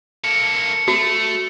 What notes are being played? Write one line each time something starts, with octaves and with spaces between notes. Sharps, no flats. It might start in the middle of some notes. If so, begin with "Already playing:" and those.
A#3 A4 C#7
A3 F#4